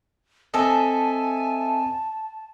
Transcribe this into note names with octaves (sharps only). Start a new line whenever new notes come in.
C4 A4 D#5 E5 G#5 A5